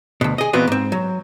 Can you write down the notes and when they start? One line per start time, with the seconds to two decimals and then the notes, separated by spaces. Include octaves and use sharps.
0.21 D2 B2
0.38 G#4 D#5
0.53 A#2 E3 B3 C4 F#4 D#5
0.67 G#2 C4
0.92 F#3